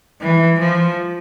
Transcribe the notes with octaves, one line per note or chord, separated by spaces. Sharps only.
E3
F3